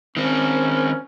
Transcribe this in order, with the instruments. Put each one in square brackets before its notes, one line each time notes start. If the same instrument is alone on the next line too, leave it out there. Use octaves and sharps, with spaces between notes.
[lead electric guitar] D#3 C4 [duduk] C#4